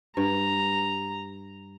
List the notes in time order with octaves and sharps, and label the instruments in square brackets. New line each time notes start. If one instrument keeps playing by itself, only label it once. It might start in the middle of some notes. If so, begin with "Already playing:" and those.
[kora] G2 [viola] A#5